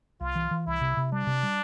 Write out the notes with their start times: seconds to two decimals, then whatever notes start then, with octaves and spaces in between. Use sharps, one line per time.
0.21 C2 F4
0.35 E3
0.51 E3
0.66 C2 E4
0.81 C3
0.97 C3
1.12 G3 D4
1.27 C3
1.43 G3